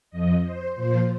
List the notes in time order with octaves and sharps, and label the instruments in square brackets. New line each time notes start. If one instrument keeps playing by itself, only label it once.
[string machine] F2 F3 D#5
C5
A#2 F3 C5